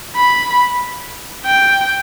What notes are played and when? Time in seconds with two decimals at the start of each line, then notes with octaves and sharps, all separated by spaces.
0.16 B5
1.46 G5